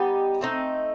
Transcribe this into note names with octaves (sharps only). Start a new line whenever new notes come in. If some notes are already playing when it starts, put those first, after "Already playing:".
Already playing: G3 B3 D#4 G4
A3 C4 D#4